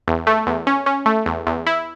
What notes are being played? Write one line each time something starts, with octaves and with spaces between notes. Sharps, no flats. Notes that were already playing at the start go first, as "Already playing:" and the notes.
E2
A3
E2
C#4
C#4
A3
E2
E2
E4